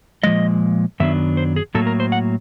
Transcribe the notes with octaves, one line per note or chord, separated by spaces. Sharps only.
A#2 F3 G#3 D#5
F#2 D#3 F#3 B3 D4 E5
C5
G#4
A2 F#3 A#3 A4
A#4
C5
F#5